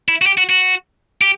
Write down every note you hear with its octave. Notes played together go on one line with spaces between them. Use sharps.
E4
F#4
G4
F#4
F#4
G4